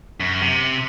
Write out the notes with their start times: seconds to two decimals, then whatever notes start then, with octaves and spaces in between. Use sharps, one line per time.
0.20 F#2
0.41 C3